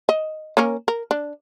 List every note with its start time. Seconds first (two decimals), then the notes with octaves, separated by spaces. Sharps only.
0.09 D#5
0.57 A#3 C#4 A#4
0.88 A#4
1.11 D4